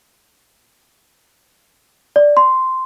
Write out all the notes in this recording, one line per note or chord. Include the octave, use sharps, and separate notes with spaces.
D5
C6